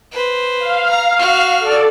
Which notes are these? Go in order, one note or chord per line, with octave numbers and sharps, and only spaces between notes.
B4 C5
F5
A#5
F#4 F6
A4 D5